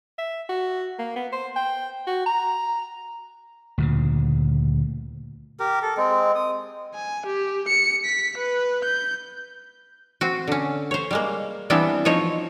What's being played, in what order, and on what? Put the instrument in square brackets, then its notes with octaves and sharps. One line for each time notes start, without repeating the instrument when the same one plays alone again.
[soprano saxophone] E5
F#4
A#3
B3
C5
G5
F#4
A#5
[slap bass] D2 A#2 C#3
[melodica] G4 A#4
A4
G#3 C4
D#6
[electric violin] G#5
G4
C#7
B6
B4
G6
[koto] C4 F#4
D3 C#4
C5 C#5
G3 G#3 A#3
E3 G3 B3 C4 D4 E4
F3 D#4 C#5 D#5